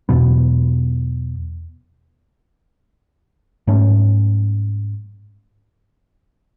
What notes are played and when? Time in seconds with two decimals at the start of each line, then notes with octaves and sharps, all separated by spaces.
0.09 E2 B2 F#3 B3
3.67 G#2 F#3 A3 C#4